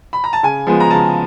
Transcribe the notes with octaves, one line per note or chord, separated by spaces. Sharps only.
B5
A#5
A5
C#3 G#5
F3 G#3 B3
A#5
C#3 A5